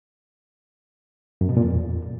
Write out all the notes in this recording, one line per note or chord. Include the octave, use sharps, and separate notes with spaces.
F#2
B2
A#2
F2
E2